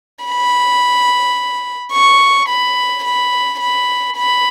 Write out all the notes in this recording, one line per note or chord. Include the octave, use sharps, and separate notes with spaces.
B5
C#6
B5
B5
B5
B5